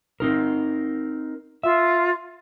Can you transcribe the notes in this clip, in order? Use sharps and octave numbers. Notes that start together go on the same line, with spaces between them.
C4 D#4 A#4
F4 E5